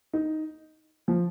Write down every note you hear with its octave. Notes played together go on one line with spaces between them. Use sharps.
D#4
F3